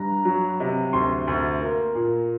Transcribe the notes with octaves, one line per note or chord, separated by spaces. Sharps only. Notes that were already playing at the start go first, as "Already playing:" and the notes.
Already playing: G2 A#5
F#3
C3
D2 C6
D2
A#3
A#2